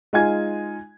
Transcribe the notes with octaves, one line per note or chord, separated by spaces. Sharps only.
G#3 D#4 F4 G#5 G#6